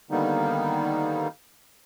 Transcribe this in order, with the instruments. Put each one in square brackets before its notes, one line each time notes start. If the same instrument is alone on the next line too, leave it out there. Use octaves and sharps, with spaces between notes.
[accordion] D3 D#3 G3 A#3 B3 D#4